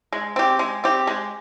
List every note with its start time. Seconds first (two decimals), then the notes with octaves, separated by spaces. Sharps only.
0.12 G#3
0.36 C4 G4
0.59 G#3
0.84 C4 G4
1.07 G#3